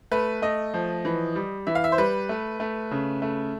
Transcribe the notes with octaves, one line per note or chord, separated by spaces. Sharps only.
A3 B4
A3 D#5
F3
E3
G3
E3 E5
F5
E5
C5
G3 B4
A3
A3
C#3
A3